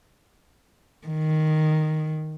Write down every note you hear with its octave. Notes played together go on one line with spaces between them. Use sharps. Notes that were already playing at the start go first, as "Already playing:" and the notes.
D#3